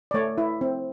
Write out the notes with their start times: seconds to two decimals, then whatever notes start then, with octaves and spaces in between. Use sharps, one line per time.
0.11 D5
0.14 A3 C#5
0.38 E4
0.61 C4